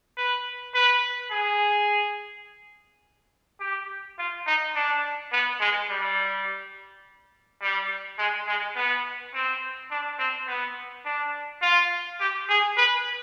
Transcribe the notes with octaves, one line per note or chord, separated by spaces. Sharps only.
B4
B4
G#4
G4
F4
D#4
D4
B3
G#3
G3
G3
G#3
G#3
B3
C4
D4
C4
B3
D4
F4
G4
G#4
B4